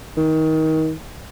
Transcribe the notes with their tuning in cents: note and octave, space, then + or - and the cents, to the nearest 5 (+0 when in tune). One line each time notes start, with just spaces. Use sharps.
D#3 +25